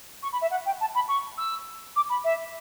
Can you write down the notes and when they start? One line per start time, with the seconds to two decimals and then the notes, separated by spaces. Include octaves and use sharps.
0.23 C#6
0.32 B5
0.42 E5
0.51 F#5
0.66 G5
0.80 A5
0.95 B5
1.08 C#6
1.38 E6
1.96 D6
2.09 B5
2.24 E5